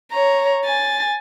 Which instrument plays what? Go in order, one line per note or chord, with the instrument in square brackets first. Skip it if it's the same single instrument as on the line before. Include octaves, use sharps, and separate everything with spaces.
[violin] C#5 A#5
G#5 A6